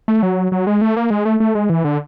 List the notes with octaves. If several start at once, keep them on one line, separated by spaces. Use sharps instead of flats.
A3
F#3
F#3
G#3
A3
A#3
G#3
A3
A3
G#3
E3
D3